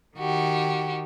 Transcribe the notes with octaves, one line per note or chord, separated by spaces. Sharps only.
D#3 F#4 G4